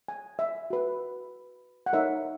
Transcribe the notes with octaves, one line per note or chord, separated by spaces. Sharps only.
G#5
E5
F#4 B4
F#5
D#4 A#4 C#5 E5